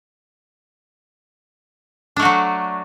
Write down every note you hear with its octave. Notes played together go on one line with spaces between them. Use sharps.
F#3 A3 D4 F#4